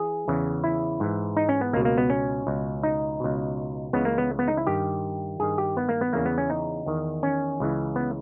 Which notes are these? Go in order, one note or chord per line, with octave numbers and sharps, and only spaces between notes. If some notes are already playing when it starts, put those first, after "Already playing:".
Already playing: E3 G#4
E2 C#3 E3
E4
G#2 E3
D#4
C#4
B3
C#2 B2 A#3
A#3
B3
C#4
C#2 B2
D#4
C#2 B2
C#2 C#3 E3 B3
A#3
B3
B3
D#4
E4
G2 D#3 G4
G2 D#3 G#4
G4
B3
A#3
B3
E2 C#3 E3 A#3
B3
C#4
D#4
E2 D#3
C#4
C#2 C#3 E3
B3